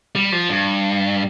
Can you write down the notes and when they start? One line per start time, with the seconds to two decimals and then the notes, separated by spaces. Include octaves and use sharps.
0.16 G3
0.32 F3
0.49 G2